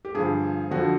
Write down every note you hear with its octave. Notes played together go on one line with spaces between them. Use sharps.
G4
G2 D3 F3 G#4
F2 D3 F3 F#4